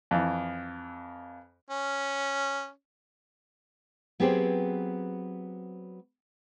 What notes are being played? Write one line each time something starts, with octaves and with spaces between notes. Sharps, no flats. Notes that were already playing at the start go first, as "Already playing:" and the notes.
F2 E3
C#4
F#3 B3 C4 G4 G#4 C5